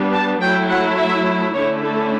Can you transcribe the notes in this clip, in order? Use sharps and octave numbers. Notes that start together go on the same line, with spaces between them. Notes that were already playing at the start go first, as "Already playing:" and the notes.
Already playing: G3 B3 D4
A5
F#3 A3 E4 G5
F#5
E5
D3 A3 C#4 E4 C#5
A4